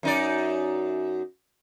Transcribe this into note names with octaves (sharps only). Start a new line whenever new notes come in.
F#2 D#4 D5